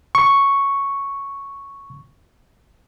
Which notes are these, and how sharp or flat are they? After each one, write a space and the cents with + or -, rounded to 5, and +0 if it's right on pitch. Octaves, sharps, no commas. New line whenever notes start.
C#6 +0